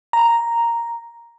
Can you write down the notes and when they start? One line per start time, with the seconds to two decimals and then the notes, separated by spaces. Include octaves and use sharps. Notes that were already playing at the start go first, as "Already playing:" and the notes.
0.13 A#5